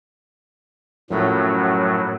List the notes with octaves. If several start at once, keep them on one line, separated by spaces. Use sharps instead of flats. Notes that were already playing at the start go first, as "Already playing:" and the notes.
F#2 A2 F3 F#3 A3 C#4